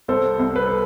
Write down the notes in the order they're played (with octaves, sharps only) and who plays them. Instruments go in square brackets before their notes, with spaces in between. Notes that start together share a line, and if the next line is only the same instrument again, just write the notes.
[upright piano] C2 A4 C5
C2
B4
A4